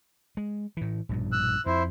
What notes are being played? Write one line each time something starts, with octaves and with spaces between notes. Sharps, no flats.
G#3
A2 E3
A#1 G2 B2
E6 F#6
F2 E4 C5